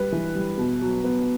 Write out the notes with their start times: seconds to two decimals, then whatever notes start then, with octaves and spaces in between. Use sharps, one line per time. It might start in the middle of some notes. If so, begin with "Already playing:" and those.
Already playing: G3 B4
0.12 E3
0.35 G3
0.57 B2
0.81 F#3
1.04 B3